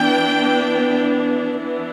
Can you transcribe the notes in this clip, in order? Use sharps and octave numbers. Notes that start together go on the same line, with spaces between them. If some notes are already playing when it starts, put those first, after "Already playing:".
Already playing: E3 B3 D4 G5
E3 B3 D4